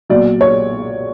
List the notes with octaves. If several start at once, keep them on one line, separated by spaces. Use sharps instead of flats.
B1 A#2 F#3 D5
C#5